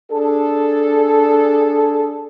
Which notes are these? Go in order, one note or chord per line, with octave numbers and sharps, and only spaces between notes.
D4 G#4 A4